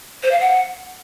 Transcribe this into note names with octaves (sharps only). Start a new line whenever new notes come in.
C5
F5
F#5